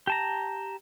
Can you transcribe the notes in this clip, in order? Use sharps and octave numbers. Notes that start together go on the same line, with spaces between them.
G4 A5 A#5